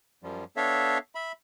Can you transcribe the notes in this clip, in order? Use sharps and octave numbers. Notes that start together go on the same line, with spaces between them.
F#2 F3 G3
B3 D4 A4 C#5 E5 F5
E5 B5